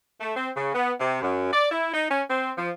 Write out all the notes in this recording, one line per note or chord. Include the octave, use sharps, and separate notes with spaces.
A3
C4
C#3
B3
C3
F#2
D5
E4
D#4
C#4
C4
F3